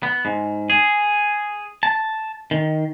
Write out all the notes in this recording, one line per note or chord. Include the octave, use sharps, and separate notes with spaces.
B3
G#2
G#4
A5
D#3